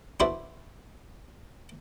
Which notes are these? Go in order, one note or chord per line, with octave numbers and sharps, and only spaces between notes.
D4 E4 F#4 A4 B4 C5